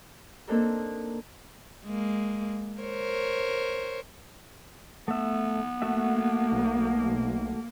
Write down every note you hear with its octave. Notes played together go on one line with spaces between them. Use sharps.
A#3 C4 D4 D#4 A4 A#4
G#3 A#3
A#4 C5 C#5
A3 B3 E5
A3 A#3 F#4 E5
B1